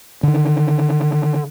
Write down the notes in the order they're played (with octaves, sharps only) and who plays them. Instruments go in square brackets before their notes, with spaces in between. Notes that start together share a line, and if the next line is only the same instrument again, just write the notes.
[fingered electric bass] D3 D#3